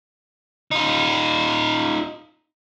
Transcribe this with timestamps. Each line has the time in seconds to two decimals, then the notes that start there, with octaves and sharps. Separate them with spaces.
0.71 D#4 F4